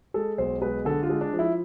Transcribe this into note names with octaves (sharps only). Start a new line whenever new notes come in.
G#3 A4
B1 C5
G#3 B4
D3 A4
F4
G#3
D4
F3
E4